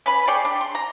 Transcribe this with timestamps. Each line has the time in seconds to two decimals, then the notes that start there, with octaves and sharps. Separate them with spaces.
0.06 C#4 B4 B5
0.27 G#4 C#5 D5 G5
0.45 D4
0.61 C6
0.75 A#5